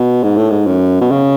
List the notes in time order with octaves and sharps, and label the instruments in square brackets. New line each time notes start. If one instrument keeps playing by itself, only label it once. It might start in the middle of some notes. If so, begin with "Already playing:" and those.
Already playing: [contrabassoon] B2
G#2
A2
G#2
F#2
B2
C#3